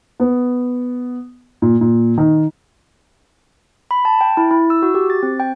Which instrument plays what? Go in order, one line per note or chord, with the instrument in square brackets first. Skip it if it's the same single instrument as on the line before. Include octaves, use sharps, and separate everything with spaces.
[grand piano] B3
A#2
A#2
D#3
[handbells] B5
A5
G5
E4
E4
E6
F#4
G4
A6
C4
G5